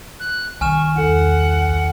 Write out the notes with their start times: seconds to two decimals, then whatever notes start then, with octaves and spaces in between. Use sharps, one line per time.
0.20 F#6
0.61 C2 D#3 G#5 C#6 F6 E7
0.96 E2 A4 F#5